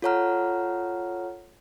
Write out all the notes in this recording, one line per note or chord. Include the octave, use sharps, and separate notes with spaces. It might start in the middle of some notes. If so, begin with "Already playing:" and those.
F4 A4 C#5 F#5 A#5 F6